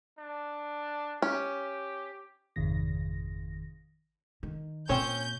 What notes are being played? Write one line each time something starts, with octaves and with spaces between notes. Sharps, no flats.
D4
C#4 G4
G#1 F2 C3 D#3 A#6
D#3
A#2 C4 C#4 C#5 G6